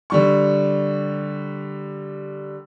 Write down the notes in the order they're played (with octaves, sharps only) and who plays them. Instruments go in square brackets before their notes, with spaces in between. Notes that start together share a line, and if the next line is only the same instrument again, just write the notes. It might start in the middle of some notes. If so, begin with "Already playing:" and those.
[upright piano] D3 G3 C#6